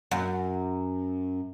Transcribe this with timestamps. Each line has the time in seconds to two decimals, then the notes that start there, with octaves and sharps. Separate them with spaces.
0.11 F#2